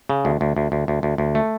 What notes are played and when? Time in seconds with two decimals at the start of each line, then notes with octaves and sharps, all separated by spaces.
0.09 C#3
0.25 D2
0.41 D2
0.57 D2
0.72 D2
0.88 D2
1.03 D2
1.18 D2
1.35 A3